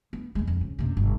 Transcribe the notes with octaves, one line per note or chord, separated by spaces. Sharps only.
B3
D#2 G#3
F2
C#3
F#1 C3
G1